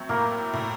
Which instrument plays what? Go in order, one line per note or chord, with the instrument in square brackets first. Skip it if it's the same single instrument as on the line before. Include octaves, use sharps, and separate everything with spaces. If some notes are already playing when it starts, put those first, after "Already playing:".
Already playing: [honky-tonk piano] F#3 A3 [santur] C4
[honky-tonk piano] A2 [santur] A#3
[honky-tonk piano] A2